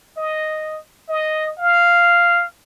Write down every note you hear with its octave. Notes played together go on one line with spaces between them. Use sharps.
D#5
D#5
F5